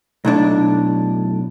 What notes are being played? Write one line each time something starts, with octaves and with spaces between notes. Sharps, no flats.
B1 A2 D4